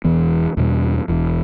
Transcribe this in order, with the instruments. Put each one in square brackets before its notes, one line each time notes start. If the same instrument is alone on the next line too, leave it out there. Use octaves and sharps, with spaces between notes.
[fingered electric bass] E1 E2 E3 B3
E2 B2 G3
E1 E2 E3